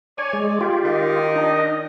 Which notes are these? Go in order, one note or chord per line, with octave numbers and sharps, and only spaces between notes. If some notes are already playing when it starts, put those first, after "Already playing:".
C#5 D5 G#5
G#3
F4 G4
D#3
D4 D#4 D#5